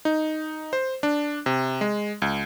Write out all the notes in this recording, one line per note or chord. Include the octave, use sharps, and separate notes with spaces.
D#4
C5
D4
C3
G#3
C#2